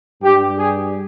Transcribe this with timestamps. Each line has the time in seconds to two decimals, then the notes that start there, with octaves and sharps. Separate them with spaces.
0.22 G2 G3 G4
0.57 G#4